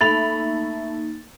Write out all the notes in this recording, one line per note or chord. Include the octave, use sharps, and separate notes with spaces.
A3 A#3 D#4 B5 A6 F7